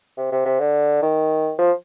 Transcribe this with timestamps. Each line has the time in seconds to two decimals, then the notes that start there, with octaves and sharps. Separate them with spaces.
0.17 C3
0.32 C3
0.45 C3
0.60 D3
1.02 D#3
1.59 F3